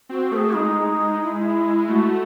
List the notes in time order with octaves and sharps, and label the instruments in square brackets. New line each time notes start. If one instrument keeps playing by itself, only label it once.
[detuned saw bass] C4 [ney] F#4
[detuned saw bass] A3 [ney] A#4
[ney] G#4
[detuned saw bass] G#3 [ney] D#4
[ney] E4
[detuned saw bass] A3 [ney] F#4